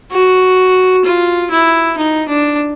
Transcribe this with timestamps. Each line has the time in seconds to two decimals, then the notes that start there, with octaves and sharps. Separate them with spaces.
0.12 F#4
1.05 F4
1.51 E4
1.98 D#4
2.29 D4